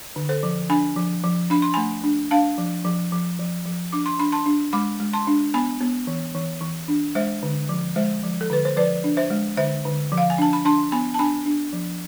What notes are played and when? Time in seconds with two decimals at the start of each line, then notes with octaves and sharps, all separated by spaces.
0.16 D3
0.29 A4 C5
0.43 F3
0.69 D4 G#5 B5
0.96 F3
1.23 F3
1.50 D4 B5
1.62 C6
1.74 A3 G#5 B5
2.04 D4
2.31 D4 F5 A5
2.58 F3
2.85 F3
3.12 F3
3.39 F3
3.65 F3
3.92 D4 D6
4.06 C6
4.19 D4 B5
4.32 A5 C6
4.46 D4
4.73 G#3 B5 D6
5.00 G#3
5.13 A5 C6
5.27 D4
5.54 B3 G#5 B5
5.81 B3
6.07 E3
6.35 E3
6.61 E3
6.88 D4
7.15 G#3 C5 E5
7.43 D3
7.69 F3
7.96 G#3 C5 E5
8.23 F3
8.41 A4
8.50 D3 B4
8.65 C5
8.77 F3 B4 D5
9.04 D4
9.17 C5 E5
9.30 G#3
9.57 D3 C5 E5
9.85 D3
10.12 F3
10.18 F5
10.30 G#5
10.38 D4 A5
10.53 B5
10.65 D4 A5 C6
10.92 B3 G#5 B5
11.14 A5
11.19 D4 G#5 B5
11.46 D4
11.73 F3